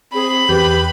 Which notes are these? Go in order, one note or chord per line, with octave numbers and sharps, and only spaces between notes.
C4 G#4 B5
E2 G4 B4 G6